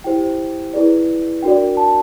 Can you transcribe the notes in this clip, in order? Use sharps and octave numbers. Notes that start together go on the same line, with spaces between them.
E4 G4 C5 G5
E4 G#4 B4 D5
D4 F#4 A#4 D5 G5
A5